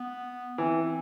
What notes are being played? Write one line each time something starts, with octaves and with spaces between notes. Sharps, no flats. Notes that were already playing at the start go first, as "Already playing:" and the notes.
Already playing: B3
E3 C4